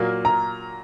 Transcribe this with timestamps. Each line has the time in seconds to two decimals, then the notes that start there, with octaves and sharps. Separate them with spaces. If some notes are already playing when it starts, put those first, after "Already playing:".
Already playing: A#2 F#3 A#3
0.25 A#5